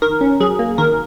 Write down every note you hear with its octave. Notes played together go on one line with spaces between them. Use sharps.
D#3 A#4
C#4
F#3 G#4
A#3
D#3 A#4